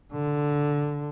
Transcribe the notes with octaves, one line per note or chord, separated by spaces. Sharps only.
D3